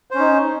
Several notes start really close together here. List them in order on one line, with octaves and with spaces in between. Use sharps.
C5 C#4 D#4